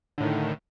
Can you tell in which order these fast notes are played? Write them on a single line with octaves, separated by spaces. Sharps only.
D3 A2 D#3